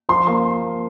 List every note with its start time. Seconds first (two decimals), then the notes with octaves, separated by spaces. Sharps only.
0.09 F3 C6
0.27 A#3 C6